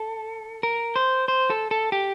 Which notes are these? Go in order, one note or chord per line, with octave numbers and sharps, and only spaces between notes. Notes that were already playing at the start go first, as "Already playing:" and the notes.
Already playing: A4
A#4
C5
C5
A4
A4
G4